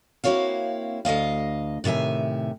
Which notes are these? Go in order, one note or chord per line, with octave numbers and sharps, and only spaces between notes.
A#3 C4 E4 F#4 C#5 F5
D2 E3 D#5 F5
A2 C3 D#3 E5 G#5